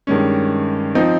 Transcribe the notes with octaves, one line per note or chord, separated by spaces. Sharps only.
G2 D#3 G#3 C#4
F3 C4 D#4